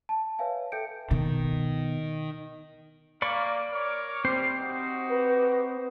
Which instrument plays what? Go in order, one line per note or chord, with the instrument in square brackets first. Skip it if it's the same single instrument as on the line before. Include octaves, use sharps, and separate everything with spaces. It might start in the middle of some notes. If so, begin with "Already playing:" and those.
[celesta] A5
B4 C#5 E5 F5 G#5
A4 E5 G5 G6 C#7 D7
[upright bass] B2 [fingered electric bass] D#3
[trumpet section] A#3 [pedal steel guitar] D5 B5 C#6
[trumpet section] A#4 C#5 D6
[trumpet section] G3 [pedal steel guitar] C4 C5
[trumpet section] D#4 F#4 G4
[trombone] B4